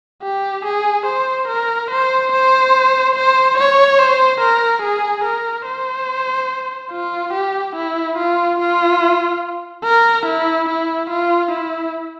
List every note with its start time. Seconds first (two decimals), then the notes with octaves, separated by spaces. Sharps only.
0.23 G4
0.65 G#4
1.06 C5
1.48 A#4
1.91 C5
2.32 C5
3.16 C5
3.58 C#5
3.99 C5
4.40 A#4
4.82 G#4
5.25 A#4
5.66 C5
6.92 F4
7.34 G4
7.76 E4
8.18 F4
8.60 F4
9.84 A#4
10.26 E4
10.69 E4
11.10 F4
11.51 E4